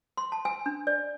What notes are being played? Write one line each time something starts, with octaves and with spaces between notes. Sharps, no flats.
C6
A5
G#5
D4
D5